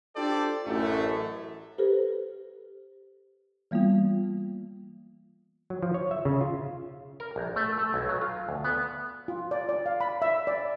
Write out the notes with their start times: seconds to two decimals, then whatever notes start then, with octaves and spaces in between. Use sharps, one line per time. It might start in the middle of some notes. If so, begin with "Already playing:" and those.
0.16 D4 F4 G4 A4 C5 D5
0.65 A1 F#2 A3
1.78 G4 A4 B4 C5
3.71 E3 G3 A#3 B3 F4
5.70 F#3
5.83 F3
5.94 C#5
6.11 E5
6.25 C#3
6.41 F4
7.20 A#4
7.36 A#1
7.56 A3
7.78 A3
7.94 B1
8.09 F#3
8.21 F4
8.49 D2
8.64 B3
9.28 F4
9.51 D5
9.69 D5
9.86 F5
10.01 B5
10.22 E5
10.47 D5